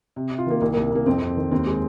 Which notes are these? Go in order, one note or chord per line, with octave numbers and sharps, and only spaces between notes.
C3
C3
F4
D#3 A#3
C2 A#3
A#3
C2
C2 A#3
F2 C4
F2
D#3
D#2 C4
G#3